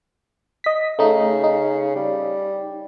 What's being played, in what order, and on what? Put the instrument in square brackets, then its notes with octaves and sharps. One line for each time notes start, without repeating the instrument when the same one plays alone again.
[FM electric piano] D#5 B6
[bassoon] C#3 [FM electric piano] A3 D#4
[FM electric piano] D#4
[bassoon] G3